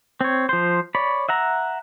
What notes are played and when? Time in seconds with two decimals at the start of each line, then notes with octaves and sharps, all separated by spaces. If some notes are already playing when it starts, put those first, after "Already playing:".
0.21 C4 C#5
0.49 F3 C5
0.95 C#5 D5 B5
1.29 E5 F#5 A#5